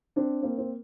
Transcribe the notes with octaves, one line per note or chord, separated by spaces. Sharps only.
C4 D4
A#3 C4
C4